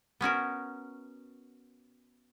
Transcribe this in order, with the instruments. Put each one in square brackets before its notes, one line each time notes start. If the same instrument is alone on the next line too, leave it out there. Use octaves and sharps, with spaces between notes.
[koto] B3 C#4 F#4 A#4